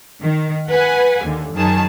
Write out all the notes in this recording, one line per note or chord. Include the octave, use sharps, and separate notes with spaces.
D#3
B4 F#5 G#5
D#2 D3
F#2 D#3 F#3 G#4 A5